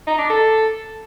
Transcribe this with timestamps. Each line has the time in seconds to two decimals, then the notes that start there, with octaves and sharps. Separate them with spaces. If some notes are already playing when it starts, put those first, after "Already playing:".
0.07 D#4
0.18 D4
0.30 A4